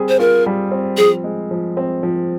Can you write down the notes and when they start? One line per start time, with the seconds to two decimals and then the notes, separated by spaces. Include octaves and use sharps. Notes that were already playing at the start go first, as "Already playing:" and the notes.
Already playing: G3 C4 G#4
0.09 C5
0.19 F4 A#4
0.46 G3
0.71 C4
0.97 F3 G#4
1.24 G#3
1.51 F3
1.77 C4
2.03 F3